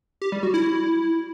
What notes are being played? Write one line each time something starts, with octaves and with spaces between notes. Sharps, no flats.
G4
G3
F#4
E4